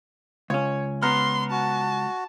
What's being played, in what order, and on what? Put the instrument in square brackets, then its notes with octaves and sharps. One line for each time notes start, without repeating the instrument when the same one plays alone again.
[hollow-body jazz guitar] C#2 C#4 [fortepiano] C#5
[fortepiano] B3 A#5 F6 [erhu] C6
[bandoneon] F#4 [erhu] A5